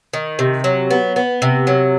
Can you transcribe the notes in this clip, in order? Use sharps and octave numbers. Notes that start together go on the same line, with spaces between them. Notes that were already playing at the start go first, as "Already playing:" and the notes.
D#3
C3
F#3
B3
B3
C3
F#3